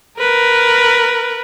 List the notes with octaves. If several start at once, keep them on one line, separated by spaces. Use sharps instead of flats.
A#4 B4